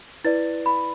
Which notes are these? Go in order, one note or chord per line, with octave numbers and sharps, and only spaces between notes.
E4 B4 D5 A6
B5